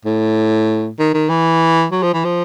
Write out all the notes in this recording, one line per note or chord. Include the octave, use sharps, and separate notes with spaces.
A2
D#3
D#3
E3
F#3
F3
E3
F3